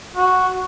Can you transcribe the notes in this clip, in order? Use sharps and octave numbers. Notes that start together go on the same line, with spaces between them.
F#4